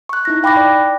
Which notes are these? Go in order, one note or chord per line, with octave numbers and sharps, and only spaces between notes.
C#6 F#6
D#4 E4 A#6
F5 G5 B5 D6 F#6 A#6
D5